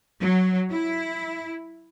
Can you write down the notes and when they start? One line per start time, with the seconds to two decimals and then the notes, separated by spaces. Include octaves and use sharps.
0.20 F#3
0.70 E4